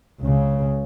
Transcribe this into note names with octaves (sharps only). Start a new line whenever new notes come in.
C#2 C#3